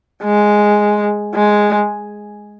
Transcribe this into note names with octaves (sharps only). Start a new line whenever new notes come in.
G#3
G#3